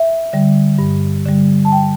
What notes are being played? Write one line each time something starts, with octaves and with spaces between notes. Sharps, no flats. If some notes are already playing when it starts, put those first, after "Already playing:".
Already playing: E5
D3 G3
G2
D3 G3
A5
G5